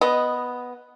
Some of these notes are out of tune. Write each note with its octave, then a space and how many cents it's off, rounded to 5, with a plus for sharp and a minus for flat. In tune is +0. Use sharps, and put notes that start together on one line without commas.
B3 +0 D#5 +0